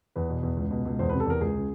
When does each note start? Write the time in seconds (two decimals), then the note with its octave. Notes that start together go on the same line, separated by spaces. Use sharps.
0.16 E2 B4
0.29 B2
0.43 E2
0.57 C#2
0.71 B2
0.86 C#2
0.99 E2 C5
1.09 C3 B4
1.20 A4
1.26 E2 A#4
1.41 C#2 G#4
1.55 C#3